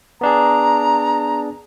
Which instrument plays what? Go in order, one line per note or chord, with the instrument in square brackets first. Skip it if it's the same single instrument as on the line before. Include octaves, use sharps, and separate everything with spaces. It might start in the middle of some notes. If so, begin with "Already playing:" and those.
[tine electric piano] B3 D4 G#4 [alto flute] A#5